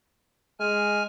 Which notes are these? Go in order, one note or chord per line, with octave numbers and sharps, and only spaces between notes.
G#3 G#5 F6